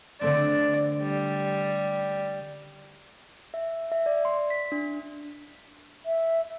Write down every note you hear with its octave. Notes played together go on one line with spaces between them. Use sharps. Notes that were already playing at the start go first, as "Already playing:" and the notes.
D3 A3 C4 D5
G3
E5
E5
D5
C6
B6
D4
E5